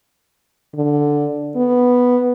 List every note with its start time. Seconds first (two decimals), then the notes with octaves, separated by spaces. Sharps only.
0.75 D3
1.56 B3